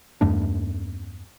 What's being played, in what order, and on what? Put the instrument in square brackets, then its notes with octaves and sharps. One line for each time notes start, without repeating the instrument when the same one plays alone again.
[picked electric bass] E2 G2 A3 D4